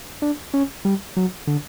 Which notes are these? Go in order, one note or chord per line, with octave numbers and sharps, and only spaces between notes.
D4
C#4
G3
F#3
D3